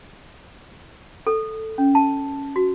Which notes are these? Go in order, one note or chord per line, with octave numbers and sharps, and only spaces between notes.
A4
C#4
A5
F#4